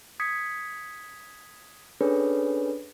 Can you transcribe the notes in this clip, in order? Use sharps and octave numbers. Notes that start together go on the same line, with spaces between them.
D#6 G#6 B6 C#7
C#4 D4 G#4 A4 B4 C#5